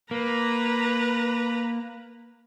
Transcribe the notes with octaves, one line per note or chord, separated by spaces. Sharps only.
A#3 B4 A#5